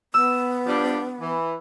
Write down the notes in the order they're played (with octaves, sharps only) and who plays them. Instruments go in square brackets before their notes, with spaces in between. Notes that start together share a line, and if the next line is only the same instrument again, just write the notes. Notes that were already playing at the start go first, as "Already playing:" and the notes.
[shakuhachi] B3 [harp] E6
[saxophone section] F3 G3 D4
E3